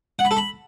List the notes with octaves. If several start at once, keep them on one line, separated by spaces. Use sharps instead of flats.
F#5
B5
A4
B5